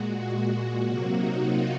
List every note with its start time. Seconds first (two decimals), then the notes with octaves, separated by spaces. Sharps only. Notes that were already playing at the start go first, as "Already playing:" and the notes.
Already playing: A#2 G#3 F#4
0.25 F#4
0.85 C3 F#3 A#3 F#4
1.14 D#4
1.44 F4